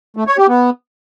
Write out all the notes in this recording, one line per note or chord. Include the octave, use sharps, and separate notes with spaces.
A3
C#5
G4
B3